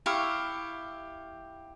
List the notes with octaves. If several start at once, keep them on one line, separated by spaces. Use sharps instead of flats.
E4 G4 F5 C#6